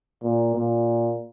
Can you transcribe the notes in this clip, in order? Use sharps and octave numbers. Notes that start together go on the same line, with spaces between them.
A#2
A#2